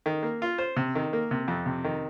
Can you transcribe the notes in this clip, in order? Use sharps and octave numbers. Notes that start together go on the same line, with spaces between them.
D#3
A#3
F4
C5
C3
D#3
A#3
C3
F2
C3
D#3